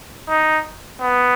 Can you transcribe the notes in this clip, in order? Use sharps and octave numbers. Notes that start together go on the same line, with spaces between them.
D#4
B3